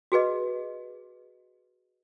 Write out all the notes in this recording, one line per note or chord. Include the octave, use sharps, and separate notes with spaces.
F#4 G#4 B4 D#5